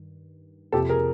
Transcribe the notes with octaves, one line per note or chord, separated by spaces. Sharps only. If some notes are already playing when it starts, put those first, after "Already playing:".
Already playing: G2 D#3
F2 C3 F3 G4 A4
G#4 A#4